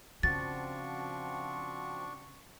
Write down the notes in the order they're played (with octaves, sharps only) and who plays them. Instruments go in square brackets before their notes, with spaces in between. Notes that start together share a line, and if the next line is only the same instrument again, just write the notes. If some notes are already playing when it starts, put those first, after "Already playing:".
[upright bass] C#3 [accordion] F3 C4 F#4 [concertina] D4 C#6 [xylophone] A6